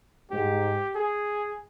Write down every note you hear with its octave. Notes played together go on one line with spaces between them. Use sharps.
G#2 G4
G#4